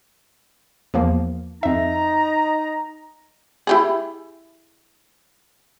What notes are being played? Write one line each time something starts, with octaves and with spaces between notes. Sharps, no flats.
E2 F3 A#3
F2 D#4 E5 A#5
E4 G4 G#4